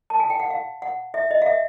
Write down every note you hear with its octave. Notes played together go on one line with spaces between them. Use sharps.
A5
G#5
G5
F#5
F5
F#5
E5
D#5
F5
E5